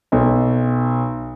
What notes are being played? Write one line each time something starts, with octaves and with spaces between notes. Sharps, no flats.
B1